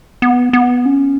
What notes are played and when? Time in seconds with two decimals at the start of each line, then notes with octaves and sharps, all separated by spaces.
0.22 B3
0.53 B3
0.86 C#4